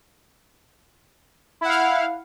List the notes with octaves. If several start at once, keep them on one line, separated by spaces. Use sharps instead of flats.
E4 F5 F#5